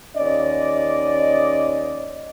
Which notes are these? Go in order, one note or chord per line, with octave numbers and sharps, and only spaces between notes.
D#2 C#4 D5 D#5